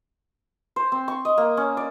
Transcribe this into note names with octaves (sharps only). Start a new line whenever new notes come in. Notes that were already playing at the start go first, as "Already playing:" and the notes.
C5
C4
C#6
D#5
A#3
C#4
D5